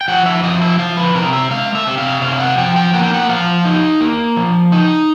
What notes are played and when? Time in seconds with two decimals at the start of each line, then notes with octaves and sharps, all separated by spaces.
0.01 G5
0.08 F3 F#5
0.26 E5
0.43 F3 D#5
0.62 E5
0.79 F3 F5
0.97 B4
1.15 C3 A#4
1.33 E5
1.51 G#3 F5
1.75 E5
1.87 C3
1.98 F5
2.22 C3 F5
2.40 F#5
2.58 F3 G5
2.76 G5
2.94 A#3 F#5
3.03 G5
3.14 F#5
3.29 F3 F5
3.65 D#4
4.01 A#3
4.36 F3
4.72 D#4